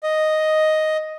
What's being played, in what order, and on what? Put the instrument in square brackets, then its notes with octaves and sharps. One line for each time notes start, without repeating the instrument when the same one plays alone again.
[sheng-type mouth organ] D#5